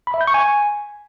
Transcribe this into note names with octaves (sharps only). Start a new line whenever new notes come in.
B5
E5
G6
C#6
G#5